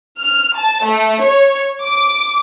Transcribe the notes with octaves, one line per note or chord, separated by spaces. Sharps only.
F6
A5
A3
C#5
D6